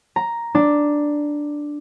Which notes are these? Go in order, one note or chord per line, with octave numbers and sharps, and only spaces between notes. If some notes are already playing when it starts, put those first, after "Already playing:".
A#5
D4